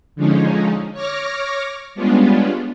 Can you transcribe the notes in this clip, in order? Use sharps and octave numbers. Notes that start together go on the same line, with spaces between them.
D3 F3 G#3 C#4 D#4
C#5 C#6 D6 F6 A#6
G3 G#3 B3 C#4 D4 F4